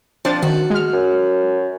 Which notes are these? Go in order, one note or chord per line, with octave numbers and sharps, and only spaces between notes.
F3 C4 D4 A6
D#3 F#4
G#3 F6
F#2